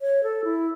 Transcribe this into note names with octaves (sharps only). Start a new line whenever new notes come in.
C#5
A4
E4